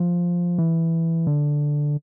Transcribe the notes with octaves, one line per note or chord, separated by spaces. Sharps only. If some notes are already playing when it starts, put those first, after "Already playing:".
Already playing: F3
E3
D3